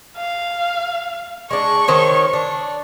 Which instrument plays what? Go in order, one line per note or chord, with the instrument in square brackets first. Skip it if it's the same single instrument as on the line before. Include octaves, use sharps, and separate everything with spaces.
[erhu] F5
[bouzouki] G#3 D4 [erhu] C#6
[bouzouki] D#3 C5 C#5
D4